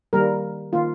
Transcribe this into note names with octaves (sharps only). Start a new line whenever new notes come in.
D#3 G3 A#3 A#4
D#3 A#3 F4